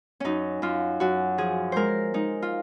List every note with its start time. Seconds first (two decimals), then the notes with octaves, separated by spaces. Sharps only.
0.20 F#2 C#4 D#4
0.62 F#2 F4
1.00 F#2 F#4
1.38 F3 G#4
1.72 G#3 A#4 C5
2.14 G#3 D#4
2.42 F4